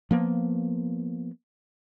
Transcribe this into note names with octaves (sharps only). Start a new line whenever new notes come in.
F3 A#3 B3